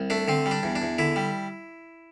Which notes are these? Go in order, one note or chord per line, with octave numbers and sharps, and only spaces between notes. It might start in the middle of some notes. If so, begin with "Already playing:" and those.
Already playing: C2
A3 D4
D3 C4
G3
D4
E2
D4
E2
D3 E4
G3